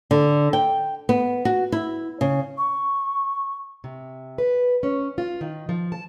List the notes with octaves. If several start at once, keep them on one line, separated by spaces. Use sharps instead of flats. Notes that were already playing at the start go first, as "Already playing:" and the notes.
D3
G5
B3
F#4
E4
C#3
C#6
C3
B4
C#4
F4
D#3
F3
A5